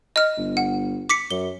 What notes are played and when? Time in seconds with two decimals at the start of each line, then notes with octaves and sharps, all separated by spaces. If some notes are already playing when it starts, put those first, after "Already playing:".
0.16 D#5 F6
0.38 G1
0.57 F#5
1.09 D6 B6 C#7
1.31 F#2 G7